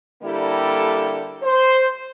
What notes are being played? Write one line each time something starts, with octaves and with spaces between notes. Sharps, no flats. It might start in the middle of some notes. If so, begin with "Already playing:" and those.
D3 G3 A#3 E4 G4 A4
C5